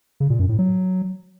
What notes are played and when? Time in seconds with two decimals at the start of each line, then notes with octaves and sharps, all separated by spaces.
0.20 C#3
0.30 A#2
0.39 F#2
0.49 A2
0.59 F#3